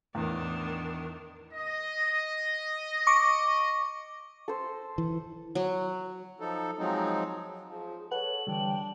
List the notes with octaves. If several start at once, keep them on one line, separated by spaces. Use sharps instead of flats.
E2 A2 D#3 D4
D#5
C#6 D6
A4 C5
E3
F#3
F3 D#4 A4
F3 F#3 G#3 C4 D#4
F3 G#4
A4 B4 C#5 F#5 F#7
D3 E3 G3 D4 G5